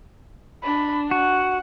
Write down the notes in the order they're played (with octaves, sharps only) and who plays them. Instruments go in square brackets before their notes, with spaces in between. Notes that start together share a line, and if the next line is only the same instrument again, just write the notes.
[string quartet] D4 [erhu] B5
[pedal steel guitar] F#4 [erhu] F#5